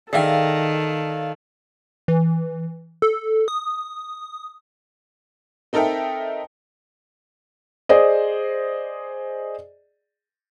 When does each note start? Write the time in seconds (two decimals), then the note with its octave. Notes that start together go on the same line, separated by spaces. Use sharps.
0.13 D#3 G#4 A4 D5 E5 F5 G5
2.08 E3
3.02 A4
3.48 D#6
5.73 C4 D#4 A4 A#4 E5 G5
7.89 G#4 C5 D5 D#5